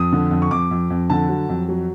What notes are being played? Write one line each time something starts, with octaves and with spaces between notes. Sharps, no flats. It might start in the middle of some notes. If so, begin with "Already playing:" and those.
Already playing: F2 D#6
D3
F2
C#6
F2 D6
F2
F2
D3 A5
F#3
F2
F#3